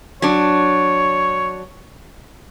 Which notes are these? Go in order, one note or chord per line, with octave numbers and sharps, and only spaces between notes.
F#3 D4 C#5